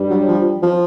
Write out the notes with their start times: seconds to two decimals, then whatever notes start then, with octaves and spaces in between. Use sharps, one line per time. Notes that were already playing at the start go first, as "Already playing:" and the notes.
Already playing: G2 G3
0.11 F#3
0.28 F3
0.63 F3